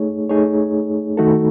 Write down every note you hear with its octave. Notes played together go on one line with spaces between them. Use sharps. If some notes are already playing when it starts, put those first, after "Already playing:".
Already playing: A3 D#4 G#4 C#5
A3 D#4 G#4 C#5
D#3 A3 D#4 F#4 A4